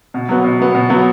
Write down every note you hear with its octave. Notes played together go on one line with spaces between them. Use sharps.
B2
F#3 B3
B2
F#3 B3
B2
F#3 B3